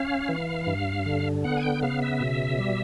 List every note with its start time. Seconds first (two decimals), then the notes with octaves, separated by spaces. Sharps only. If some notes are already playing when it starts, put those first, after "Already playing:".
Already playing: C#4 F5
0.29 E3
0.67 G2
1.06 D3
1.44 B3 F#5
1.57 G#5
1.63 G5
1.82 C#3 F5
2.02 E5
2.21 B2
2.59 G3